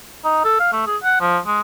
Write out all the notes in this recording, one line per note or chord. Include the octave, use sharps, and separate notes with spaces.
D#4
A4
F5
A3
G#4
F#5
F3
G#3